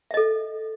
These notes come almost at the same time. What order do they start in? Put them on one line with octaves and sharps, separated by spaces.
E5 D#5 A4